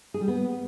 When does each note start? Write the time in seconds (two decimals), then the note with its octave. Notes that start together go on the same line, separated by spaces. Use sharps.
0.14 G#4
0.21 G3
0.28 B3